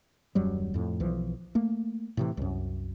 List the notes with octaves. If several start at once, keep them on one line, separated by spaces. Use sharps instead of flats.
D#1 F#2 F#3 G3
F2 A2
B1 E3 F3
A3 A#3
A2 C3 E3
C2 F#2